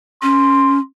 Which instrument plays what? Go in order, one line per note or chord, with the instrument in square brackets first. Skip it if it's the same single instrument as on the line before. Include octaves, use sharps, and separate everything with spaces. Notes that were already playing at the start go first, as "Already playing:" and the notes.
[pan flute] C#4 [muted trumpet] C6